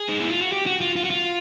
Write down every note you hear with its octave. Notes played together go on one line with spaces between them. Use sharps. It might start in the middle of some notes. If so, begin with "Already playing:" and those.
Already playing: G#4
D#4
E4
F4
F#4
G4
F#4
F4
F4
F#4
F4